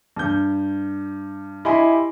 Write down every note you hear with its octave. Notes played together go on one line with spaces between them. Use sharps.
G2 G6
E4 G4 D#5 G#5 B5 C6